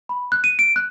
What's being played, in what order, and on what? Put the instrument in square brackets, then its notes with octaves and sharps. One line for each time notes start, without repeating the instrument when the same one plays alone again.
[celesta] B5
F#6
D#7
D7
F#6